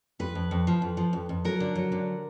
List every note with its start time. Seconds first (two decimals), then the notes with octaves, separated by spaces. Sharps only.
0.19 F2 B4
0.35 F2
0.51 F2
0.67 F3
0.82 F2
0.97 F3
1.13 F2
1.29 F2
1.45 F#3 A#4
1.60 D3
1.75 F#3
1.92 D3